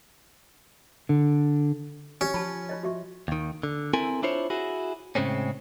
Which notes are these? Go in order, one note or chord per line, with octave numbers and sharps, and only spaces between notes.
D3
C#4 G4
F3 F4 A5 B5
F4 C#5 D#5
F#4 E5 C#6
D#2 D#3
D3
C4 E4 A4 A#4 G#5
D4 E4 F4 C5 C#5
E4 F#4 G#4
A2 C#3 G#3 C4 C#4